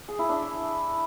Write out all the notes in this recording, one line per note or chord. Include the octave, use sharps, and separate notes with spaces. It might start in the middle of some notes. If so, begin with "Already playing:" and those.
G#4
E4
D4